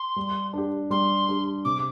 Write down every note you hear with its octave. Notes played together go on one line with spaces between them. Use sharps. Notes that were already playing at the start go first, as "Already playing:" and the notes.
Already playing: C6
G3
D4 G4
G3 C6
D4 G4
C3 D6